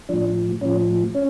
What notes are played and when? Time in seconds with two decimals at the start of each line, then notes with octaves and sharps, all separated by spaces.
0.09 A2 F3 D4
0.61 A2 F3 C#4
1.15 C#4